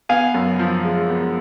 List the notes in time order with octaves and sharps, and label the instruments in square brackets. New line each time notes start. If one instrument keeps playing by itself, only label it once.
[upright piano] B3 [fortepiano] F5 G#5
[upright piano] F#2
F3
G#3
B3